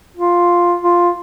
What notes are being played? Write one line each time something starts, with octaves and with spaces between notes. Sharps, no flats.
F4
F4